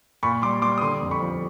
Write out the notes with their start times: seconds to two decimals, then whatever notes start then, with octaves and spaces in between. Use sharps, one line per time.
0.23 A#2 B5 C#6
0.42 G3 C6 D6
0.62 G3 C6 D6
0.78 D#6
0.81 D3 C6 D6
1.01 F2
1.11 B5 C#6
1.21 F3